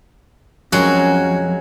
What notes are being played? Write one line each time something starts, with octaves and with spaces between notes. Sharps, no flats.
F2 F#3 G#3 C#4 F#4 A#4